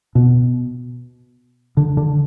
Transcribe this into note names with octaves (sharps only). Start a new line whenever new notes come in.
B2
D3
D3